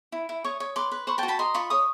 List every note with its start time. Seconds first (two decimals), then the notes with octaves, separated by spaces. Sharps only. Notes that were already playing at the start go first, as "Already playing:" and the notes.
0.12 E4
0.29 E4
0.44 C#5 C#6 D#6
0.60 C#5
0.76 B4 C6 D6
0.92 B4
1.07 C5 B5 C#6
1.18 F#4 G5 A5
1.28 A5 B5
1.39 D#5 A#5 C6
1.54 F4 B5 C#6
1.70 C#5 C#6 D#6